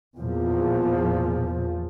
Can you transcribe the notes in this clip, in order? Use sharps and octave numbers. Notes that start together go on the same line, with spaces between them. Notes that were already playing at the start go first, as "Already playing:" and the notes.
E2 A#2 F3